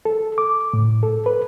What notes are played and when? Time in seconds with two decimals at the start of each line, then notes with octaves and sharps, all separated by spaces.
0.05 A4
0.38 D6
0.74 A2
1.03 A4
1.26 B4